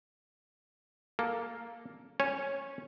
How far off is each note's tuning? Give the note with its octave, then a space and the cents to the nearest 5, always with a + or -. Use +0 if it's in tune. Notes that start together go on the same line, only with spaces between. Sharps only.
A#3 +0 A4 +0
C#4 -5 C#5 -15 G#5 +0